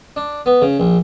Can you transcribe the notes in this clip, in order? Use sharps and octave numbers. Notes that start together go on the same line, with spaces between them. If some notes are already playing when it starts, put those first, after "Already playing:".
D4
B3
C#3
A#1